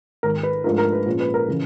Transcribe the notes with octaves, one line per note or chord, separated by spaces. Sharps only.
G#1 G#2 D#3 A#4
B4
G#2 F3 A3 D4 F4 A#4
A#4
B4
A#2 F3 G#3 C#4
B4
A#4
C#3 E3